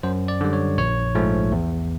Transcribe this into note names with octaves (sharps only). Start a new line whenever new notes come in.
F#2 C5
D5
D3 G3
C#5
A#1 C#5
G#2 F3 A3
E2